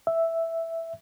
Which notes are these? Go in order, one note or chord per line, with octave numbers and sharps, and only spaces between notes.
E5